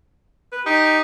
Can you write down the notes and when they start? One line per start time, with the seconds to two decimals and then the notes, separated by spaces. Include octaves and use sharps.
0.52 B4
0.66 D#4 G4